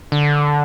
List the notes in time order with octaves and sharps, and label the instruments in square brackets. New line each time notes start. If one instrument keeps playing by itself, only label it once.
[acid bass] D3